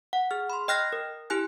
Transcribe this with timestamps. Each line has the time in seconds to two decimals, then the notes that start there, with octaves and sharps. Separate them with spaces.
0.13 F#5
0.31 G#4 F6
0.50 B5 C6
0.68 D#5 G5 F6 F#6 A#6
0.93 A#4
1.30 E4 G4 G#5 F#6